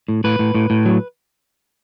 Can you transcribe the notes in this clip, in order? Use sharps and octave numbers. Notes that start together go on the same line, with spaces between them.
A2
A2 B4
A2
A2
A2
F#3